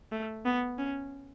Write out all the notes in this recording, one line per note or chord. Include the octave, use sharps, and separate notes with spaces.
A3
B3
C#4